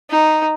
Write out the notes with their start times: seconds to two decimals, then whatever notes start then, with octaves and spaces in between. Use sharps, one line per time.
0.10 D#4